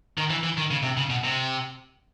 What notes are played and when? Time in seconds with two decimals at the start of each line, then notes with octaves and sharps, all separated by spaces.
0.18 D#3
0.30 E3
0.44 E3
0.58 D#3
0.71 C#3
0.83 C3
0.97 C#3
1.10 B2
1.24 C3